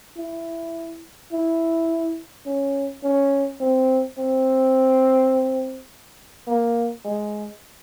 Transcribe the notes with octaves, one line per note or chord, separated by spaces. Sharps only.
E4
E4
C#4
C#4
C4
C4
A#3
G#3